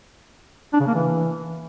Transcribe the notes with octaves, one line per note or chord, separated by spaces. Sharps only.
D4
C#3
A#3
E3